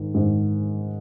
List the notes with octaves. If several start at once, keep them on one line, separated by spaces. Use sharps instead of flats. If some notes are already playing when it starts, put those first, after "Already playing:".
Already playing: G#2 D#3
G#2 D#3